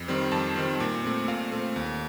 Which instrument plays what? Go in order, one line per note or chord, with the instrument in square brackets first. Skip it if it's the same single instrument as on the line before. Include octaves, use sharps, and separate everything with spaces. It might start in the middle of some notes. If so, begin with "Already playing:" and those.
Already playing: [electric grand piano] F2
D#3 G3 C4
F2 A5
D#3 G3 C4
A#2
A3 C4
A#2 F5
A3 C4
D#2